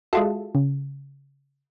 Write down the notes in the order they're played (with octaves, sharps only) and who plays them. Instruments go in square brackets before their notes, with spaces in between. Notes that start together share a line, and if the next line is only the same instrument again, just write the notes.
[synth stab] G#3 F4 A4 [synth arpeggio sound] F#4 E5
[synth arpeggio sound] C#3